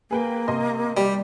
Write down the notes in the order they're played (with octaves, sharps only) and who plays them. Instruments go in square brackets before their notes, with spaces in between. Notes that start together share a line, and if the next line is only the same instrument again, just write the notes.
[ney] A#3 [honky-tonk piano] G#4 B4 G5
[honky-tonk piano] C3 D#5 C6
[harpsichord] G3 [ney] G4